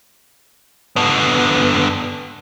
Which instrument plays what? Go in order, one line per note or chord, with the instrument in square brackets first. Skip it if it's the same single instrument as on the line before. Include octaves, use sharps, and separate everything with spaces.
[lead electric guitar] D3 B3